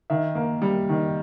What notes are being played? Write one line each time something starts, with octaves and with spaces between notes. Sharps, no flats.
D#3 E5
A#3
G3
D#3